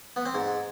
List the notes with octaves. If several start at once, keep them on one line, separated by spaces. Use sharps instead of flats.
B3
C4
G#2